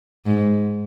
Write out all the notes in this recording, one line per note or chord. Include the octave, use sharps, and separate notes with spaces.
G#2